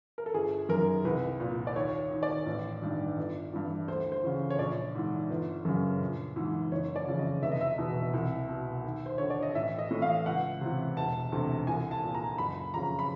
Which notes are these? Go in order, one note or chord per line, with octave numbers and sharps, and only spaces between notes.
A#4
A4
G1 G#4
F#2 D#3 A#4
C2 B4
A#2
D5
D#2 C#5
D#3
D5
A1
G2 D#3
G1
G2 E3
D2 C5
C5
C#3 E3
C#5
A#1 D5
G#2 E3
G1
F#2 C#3
A#1
G#2 E3
F#1 C#5
D5
F2 C#3 E3
D#5
F1 E5
D#5
E5
E2 B2
C2
B2
D#2
C5
D3 C#5
D5
D#5
A1 E5
D#5
A2 E3
F5
C#2 F#5
C3 E3
E1 A5
D2 C3 E3
C2 G#5
A5
A#2
A#5
F#1 B5
F2 C#3 A#5
B5